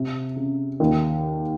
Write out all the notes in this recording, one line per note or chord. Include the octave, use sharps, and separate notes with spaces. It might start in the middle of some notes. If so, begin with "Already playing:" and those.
Already playing: C3
C#3
D#2 D#3